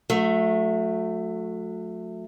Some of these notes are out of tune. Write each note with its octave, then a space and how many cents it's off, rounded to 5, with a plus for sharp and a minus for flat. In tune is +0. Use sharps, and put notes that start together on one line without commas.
F#3 -35 A3 +0